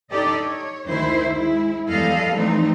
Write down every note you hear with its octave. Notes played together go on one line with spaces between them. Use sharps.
D4 D#4 G4 A4 D5 D#5
C#5
D2 D#3 E4 C5
G#3 E4
E2 F3 G3 A4 D#5 F5
E3 F3 G3 A3 C4 D#4